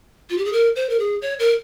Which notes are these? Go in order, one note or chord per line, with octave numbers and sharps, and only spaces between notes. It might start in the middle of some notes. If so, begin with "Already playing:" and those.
F4
G4
G#4
A#4
C5
A#4
G#4
C#5
A#4